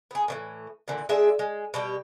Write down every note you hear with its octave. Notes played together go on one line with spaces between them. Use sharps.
B3 G#4
A2 D3 E3
A#2 D3 E3
G#3 D4 G#4 E5
G#3
B2 G3 G4